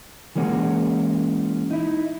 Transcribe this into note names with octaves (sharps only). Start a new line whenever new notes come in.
E3 G#3 A#3 C#4 F#4
D#4 E4